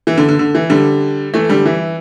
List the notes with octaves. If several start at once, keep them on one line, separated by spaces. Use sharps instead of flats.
E3
D3
D3
D3
E3
D3 G3
E3 A3
D3 G3
E3